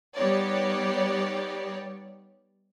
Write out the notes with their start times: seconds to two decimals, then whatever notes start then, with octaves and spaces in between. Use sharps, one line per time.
0.15 G3 B3 D#4 G4 C#5 D5